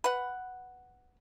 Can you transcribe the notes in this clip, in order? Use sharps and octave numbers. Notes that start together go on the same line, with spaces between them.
B4 F#5